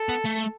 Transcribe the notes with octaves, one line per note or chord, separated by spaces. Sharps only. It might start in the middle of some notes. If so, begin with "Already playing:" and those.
Already playing: A4
B3
A3